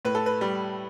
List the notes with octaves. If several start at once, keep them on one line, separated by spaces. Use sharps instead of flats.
A2 B4
A4
B4
G3